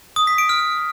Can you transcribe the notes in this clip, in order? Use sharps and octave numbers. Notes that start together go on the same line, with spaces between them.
D#6
B6
D7
F6